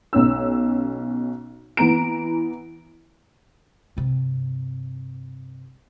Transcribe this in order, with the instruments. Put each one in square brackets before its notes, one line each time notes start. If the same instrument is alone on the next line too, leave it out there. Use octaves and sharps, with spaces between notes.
[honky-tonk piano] B1 C#4 E6
E3 B3 A#5 D7
[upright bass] G2 C3